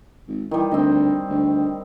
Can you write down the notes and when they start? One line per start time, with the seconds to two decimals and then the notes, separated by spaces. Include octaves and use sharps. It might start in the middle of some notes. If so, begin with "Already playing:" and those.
0.28 G#1
0.51 D#3 E3 G3
0.71 D2 C4 D#5
1.30 D2